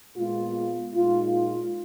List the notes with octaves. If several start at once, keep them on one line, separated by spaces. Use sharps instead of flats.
A#2 G#3 B3 F4
A#2 G#3 D#4 F4
F4